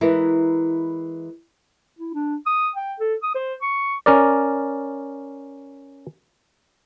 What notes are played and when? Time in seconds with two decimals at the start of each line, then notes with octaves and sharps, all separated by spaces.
0.01 E3 G#3 E4 A#4 B4
1.99 E4
2.14 D4
2.46 D#6
2.76 G5
3.00 A4
3.23 D#6
3.35 C5
3.62 C#6
4.06 C#4 A#4 D5